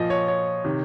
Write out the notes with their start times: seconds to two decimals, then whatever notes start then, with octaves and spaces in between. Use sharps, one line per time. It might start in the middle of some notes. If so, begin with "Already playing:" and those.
Already playing: A#2 F3 D#5
0.10 C#5
0.28 C#5
0.64 C3 D#3